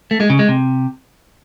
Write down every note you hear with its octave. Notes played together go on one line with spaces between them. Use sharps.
A3
G#3
C#3
G#3
C3